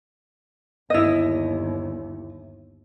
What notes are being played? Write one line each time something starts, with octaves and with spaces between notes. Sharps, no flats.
G1 D#2 E4 D#5